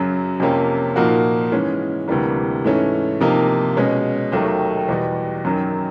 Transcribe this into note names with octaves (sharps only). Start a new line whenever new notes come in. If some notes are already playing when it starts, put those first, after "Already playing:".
Already playing: F#2 C#3 F#3
F2 C3 F3 A#3 C#4
A#2 F3 A#3 D#4 F#4
G#2 E3 G#3 C#4
D2 C3 E3 G3 A#3
G#2 E3 A3 C#4
C3 F3 A#3 D#4
B2 G#3 C#4
D#2 D#3 F#3 A3
E2 B2 G3 B3
F#2 D#3 F#3